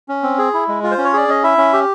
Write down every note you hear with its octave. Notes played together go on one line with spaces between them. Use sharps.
C#4
C4
G#4
E4
G#3
F4
C5
C#4
C#5
G#4 D5
C#4 D#5
E4 E5
C#4
G4